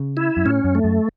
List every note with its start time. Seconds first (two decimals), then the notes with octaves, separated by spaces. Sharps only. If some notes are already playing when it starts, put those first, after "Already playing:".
Already playing: C#3
0.17 E4
0.37 F#2
0.45 A2 C#4
0.64 F#2
0.75 A3
0.84 F#2